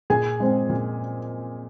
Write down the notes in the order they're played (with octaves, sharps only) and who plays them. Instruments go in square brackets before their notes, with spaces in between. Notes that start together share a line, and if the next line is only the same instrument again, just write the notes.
[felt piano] A#2 G#4 G#5
G#3 C4
A#2